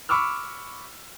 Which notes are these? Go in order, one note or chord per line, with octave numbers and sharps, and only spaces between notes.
B5 C#6 D6 E6 F6